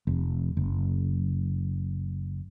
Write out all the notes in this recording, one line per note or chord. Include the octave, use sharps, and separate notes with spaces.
F1
F#1